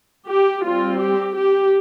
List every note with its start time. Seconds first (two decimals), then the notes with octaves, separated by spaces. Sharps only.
0.26 G4
0.62 G3 C4 F4
0.99 G4
1.35 G4